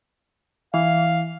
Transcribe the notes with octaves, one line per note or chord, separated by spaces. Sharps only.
E3 F5